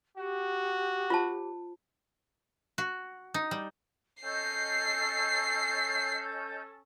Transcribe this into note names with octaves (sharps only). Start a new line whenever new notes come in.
F#4 G4
F4 C5 A5
F#4
D#4
G3
C#4 A4 D#5 G6 C7